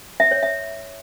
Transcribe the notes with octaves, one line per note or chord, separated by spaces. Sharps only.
E5
C#5
E5